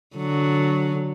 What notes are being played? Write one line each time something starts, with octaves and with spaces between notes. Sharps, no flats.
D3 F#3